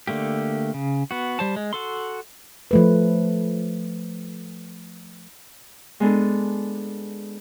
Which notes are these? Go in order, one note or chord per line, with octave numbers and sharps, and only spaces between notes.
D3 A3 A#3 G4
C#3
B3 F#4
G3 C5 A5
G#3
F#4 A4 C6
F3 A3 B4
G#3 B3 D4 A4